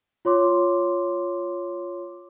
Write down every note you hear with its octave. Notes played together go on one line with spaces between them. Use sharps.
F4 C#5 C6 D6